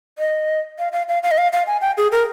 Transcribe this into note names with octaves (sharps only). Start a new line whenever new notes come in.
D#5
F5
F5
F5
F5
D#5
F5
F5
G#5
G5
G#4
A#4